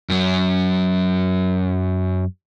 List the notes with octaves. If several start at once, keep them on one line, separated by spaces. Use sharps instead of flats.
F#2 F#3